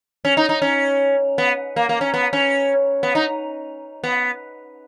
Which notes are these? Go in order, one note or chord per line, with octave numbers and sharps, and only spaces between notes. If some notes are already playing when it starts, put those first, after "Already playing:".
C#4
D#4
D#4
C#4
B3
A#3
A#3
C#4
B3
C#4
B3
D#4
B3